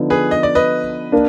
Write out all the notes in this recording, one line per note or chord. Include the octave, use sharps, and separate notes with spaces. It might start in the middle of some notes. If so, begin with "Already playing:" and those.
Already playing: D3 F3 B3 D#4
G#4 B4
D#5
D5
B4 D#5
A#3 D4